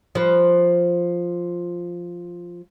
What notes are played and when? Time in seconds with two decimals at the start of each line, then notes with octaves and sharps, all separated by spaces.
0.15 F3 B4